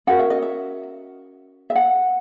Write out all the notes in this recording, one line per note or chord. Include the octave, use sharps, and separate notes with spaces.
C#4 F#4 A#4 F#5
E5
D#5
E5
E5
F#5